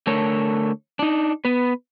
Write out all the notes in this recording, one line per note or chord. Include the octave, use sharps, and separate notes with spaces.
D3 A3 A4 A#4 C#5
D4 D#4
B3 B4